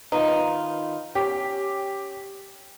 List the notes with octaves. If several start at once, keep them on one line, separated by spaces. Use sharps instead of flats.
D#3 D#4 F4 B4
C#4 G4